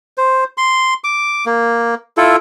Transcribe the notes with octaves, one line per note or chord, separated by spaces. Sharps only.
C5
C6
D6
A#3
E4 F4 A4